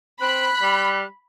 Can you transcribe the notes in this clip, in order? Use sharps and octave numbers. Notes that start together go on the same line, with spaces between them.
C4 B5 F#6
G3